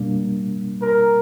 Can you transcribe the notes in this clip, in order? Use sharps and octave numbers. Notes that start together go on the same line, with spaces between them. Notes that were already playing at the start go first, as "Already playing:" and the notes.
Already playing: B2 G3 A#3 D4
A#4